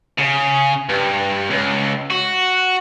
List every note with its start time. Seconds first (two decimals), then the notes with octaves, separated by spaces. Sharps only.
0.18 C#3
0.89 G2
1.50 C#2
2.10 F#4